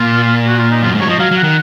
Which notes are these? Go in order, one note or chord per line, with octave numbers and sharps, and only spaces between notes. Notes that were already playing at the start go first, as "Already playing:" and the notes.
Already playing: A#2 F4
F#4
F4
D#4
F#2 F4
G#2
F#3 C#5
F3 D#5
F#3 F5
F#3
F#5
D#3